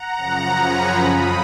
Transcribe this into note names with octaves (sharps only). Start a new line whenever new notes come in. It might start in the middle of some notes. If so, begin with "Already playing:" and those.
Already playing: F#5 A#5
F#2 C#3 F3
G#5 B5
F2 F3 B5 D#6